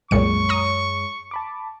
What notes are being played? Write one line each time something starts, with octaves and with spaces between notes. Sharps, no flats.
C2 F#2 A#2 G#3 C#5 C#6 C#7
A#5 D#6
A5 B5 D6